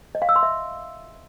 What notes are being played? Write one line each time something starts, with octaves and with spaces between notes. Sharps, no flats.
D#5
F5
E6
C6
E5